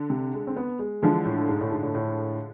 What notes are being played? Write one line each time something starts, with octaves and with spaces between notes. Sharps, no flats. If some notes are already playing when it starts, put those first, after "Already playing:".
Already playing: D3
C3
G#3
C4
B3
G#3
D3 E3 F3 G#3
A2
G#2
A2
G#2
A2
A2